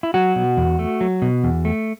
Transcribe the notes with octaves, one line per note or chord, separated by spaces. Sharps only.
E4
F#3 F#4
B2
E2
A3
F#3
B2
E2
A3